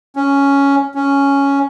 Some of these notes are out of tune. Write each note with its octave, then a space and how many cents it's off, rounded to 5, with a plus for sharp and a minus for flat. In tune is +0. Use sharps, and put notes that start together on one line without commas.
C#4 +5
C#4 +5